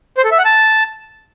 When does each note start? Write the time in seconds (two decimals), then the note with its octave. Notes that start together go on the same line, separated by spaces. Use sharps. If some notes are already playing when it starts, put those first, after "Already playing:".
0.17 C5
0.24 A4
0.31 E5
0.38 F#5
0.45 A5